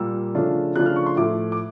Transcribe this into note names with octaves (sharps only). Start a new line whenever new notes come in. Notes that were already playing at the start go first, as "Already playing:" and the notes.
Already playing: A#2 G3 A#3 E6
C#3 F3 A3 D4 F4
C#3 F3 A3 D4 F4 F#6
F6
C#6
C6
A2 F3 A3 D6
D6